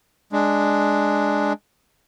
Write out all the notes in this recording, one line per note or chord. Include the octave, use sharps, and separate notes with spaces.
G#3 D4